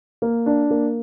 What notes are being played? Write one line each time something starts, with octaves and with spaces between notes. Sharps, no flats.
A#3
D4
A#3